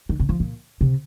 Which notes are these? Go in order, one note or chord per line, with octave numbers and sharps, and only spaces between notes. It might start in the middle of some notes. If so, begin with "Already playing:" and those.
D#3
C3
F3
A#2
C3